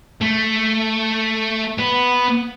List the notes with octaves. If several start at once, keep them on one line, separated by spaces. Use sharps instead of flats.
A3
B3